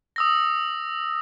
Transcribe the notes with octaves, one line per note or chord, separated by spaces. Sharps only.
D#6 E6 A#6